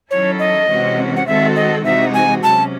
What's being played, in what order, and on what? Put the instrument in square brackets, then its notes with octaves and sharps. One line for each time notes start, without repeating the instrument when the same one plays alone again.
[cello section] D#3 F#3 C#4 E4 A4 [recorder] C#5
[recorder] D#5
[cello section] C3 E3 G#3 C#4 F#4
[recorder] F#5
[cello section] D#3 G#3 C4 F#4 A4 [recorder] E5
[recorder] D#5
[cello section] C3 E3 G#3 D#4 F#4 [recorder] E5
[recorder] G#5
[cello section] C3 F#3 C#4 [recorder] A5